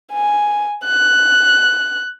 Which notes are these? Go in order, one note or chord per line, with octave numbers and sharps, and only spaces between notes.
G#5
F#6